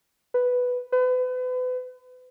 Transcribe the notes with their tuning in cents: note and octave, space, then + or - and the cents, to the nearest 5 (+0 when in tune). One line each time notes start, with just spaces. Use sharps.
B4 +0
B4 +35